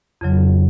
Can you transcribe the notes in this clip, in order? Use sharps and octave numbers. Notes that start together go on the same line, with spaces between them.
F2 C#3 F#3